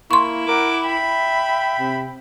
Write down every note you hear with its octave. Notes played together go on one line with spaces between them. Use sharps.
A#3 E4 C6 C#6
A#4 F#5 D6
E5 G5 B5
C3